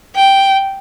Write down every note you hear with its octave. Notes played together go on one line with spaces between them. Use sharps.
G5